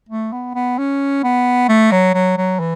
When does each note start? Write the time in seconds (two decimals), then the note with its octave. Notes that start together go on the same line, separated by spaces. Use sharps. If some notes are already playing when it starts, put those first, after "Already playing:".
0.09 A3
0.32 B3
0.55 B3
0.78 C#4
1.24 B3
1.68 A3
1.91 F#3
2.14 F#3
2.37 F#3
2.60 E3